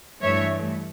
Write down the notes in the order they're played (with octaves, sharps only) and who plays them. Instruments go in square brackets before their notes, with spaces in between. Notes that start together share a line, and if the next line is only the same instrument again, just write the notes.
[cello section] G2 E3 A3 C#5 E5